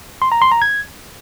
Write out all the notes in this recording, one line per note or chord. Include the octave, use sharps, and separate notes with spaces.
C6
A#5
C6
A#5
G#6